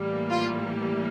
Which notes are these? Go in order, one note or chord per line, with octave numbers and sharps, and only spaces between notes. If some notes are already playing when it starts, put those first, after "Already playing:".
Already playing: A2 E3 G3 A#3
F4